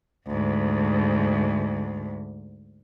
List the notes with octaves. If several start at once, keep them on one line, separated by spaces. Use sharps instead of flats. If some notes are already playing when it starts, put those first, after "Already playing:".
D2 G#2